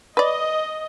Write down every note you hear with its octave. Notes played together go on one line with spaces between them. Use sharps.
B4 D5 D#5